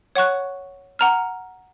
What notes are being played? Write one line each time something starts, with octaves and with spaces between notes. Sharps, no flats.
C#5 F#5 C#6 F#6
F#5 A#5 F6